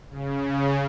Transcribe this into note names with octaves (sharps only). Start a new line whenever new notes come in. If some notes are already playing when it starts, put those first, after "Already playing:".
C#3